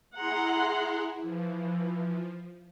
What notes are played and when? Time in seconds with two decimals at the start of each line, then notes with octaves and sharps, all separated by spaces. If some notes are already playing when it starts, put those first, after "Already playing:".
0.15 E4 G#4 F#5 A#5 C6
1.20 E3 F3